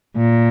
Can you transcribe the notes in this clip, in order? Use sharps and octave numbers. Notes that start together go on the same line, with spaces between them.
A#2